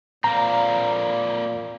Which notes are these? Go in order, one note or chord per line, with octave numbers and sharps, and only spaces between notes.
A#2 A#3 C4 A#5